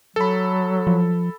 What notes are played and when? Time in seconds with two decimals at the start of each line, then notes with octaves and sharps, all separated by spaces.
0.16 F#3 A4 B5
0.87 F3